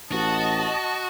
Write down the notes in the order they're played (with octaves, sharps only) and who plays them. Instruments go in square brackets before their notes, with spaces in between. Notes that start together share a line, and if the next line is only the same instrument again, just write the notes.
[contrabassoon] A1 [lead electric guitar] F#4 [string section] D#5 A5